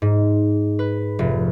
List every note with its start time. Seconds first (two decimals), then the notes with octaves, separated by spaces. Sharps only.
0.02 G#2
0.79 B4
1.19 F1